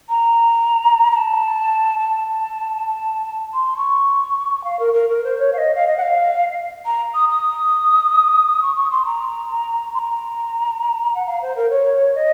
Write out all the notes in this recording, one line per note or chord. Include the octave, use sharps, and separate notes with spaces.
A#5
A#5
A5
A5
A5
C6
C#6
F5
A#4
A#4
A#4
C5
C#5
F5
D#5
F5
D#5
F#5
F5
A#5
D#6
D#6
C#6
C#6
C6
A#5
C6
A#5
F#5
F5
C5
A#4
C#5
D#5